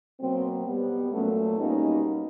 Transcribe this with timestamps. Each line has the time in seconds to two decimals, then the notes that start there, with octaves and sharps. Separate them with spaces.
0.19 B2 F#3 A#3 C4
0.65 B2 G3 B3
1.11 A#2 F#3 A3 B3 C#4
1.57 B2 G3 A#3 C#4 D#4